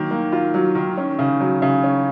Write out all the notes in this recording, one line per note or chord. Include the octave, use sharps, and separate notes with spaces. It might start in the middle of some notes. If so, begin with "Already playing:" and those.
Already playing: D#3 F#3 A#3
A#3
F4
F#3
D#3
C#4
C#3
F#3
C#3
C#4